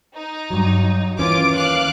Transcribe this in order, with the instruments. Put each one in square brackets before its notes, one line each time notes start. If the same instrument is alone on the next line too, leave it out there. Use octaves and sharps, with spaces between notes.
[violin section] D#4
[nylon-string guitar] G2 F#3
[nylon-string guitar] D#2 E3 C#4 [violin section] F4 D6 D7
[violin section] F5 D6 F#6